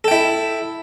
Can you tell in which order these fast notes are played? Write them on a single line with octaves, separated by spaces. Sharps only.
A4 G5 E4